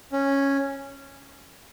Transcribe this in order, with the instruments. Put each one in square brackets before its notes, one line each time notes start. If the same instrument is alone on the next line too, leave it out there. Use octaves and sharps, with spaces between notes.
[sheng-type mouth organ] C#4